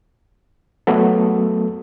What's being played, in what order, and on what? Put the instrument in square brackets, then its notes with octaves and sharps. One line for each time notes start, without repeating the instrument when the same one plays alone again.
[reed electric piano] F#3 A3 B3 A4